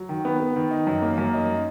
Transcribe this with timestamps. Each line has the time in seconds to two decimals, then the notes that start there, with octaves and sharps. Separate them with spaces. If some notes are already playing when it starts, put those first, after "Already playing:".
Already playing: F#3
0.09 D#3
0.25 B3
0.40 B3
0.56 D#3
0.71 D#4
0.87 F#2
1.02 A#3
1.18 F#2
1.34 D#4